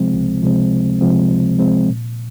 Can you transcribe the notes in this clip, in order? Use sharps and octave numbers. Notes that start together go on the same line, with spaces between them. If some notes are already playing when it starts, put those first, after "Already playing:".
Already playing: C#2 C3 F3 G#3 C4
C#2
C3 F3 G#3 C4
C#2
C3 F3 G#3 C4
C#2
C3 F3 G#3 C4
A#2